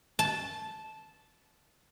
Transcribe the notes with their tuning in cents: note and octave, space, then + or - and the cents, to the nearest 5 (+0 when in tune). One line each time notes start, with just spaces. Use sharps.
A5 -10